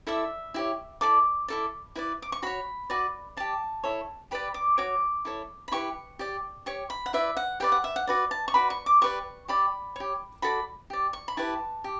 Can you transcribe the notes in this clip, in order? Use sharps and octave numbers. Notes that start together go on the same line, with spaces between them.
E4 A4 D5 E5
E4 G4 C#5
E4 A4 D5 D6
E4 A4 D5
E4 B4 D5
D6
C#6
F#4 C#5 B5
F#4 B4 D5
G4 D5 A5
E4 A4 C#5
G4 B4 D5 B5
D6
F#4 C#5 D6
E4 A4 C#5
B5
E4 G4 B4 C#6
G4 D5
G4 C#5 C#6
B5
F#5
E4 B4 D5 E5
F#5
G4 B4 D5 G5
F#5
E5
F#5
F#4 B4 D5
A5
C#6
F#4 B4 D5 B5
C#6
D6
G4 B4 D5 C#6
G4 D5 B5
G4 C#5
F#4 A4 D5 B5
G4 D5
C#6
B5
E4 G4 B4 A5
G4